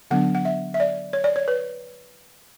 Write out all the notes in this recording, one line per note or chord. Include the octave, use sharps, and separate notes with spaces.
D3 F#3 B3 D4 F#5
F#5
E5
E5
D5
C#5
D5
C#5
B4